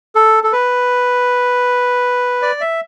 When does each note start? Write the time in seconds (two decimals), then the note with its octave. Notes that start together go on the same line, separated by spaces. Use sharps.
0.15 A4
0.44 A4
0.53 B4
2.42 D5
2.61 E5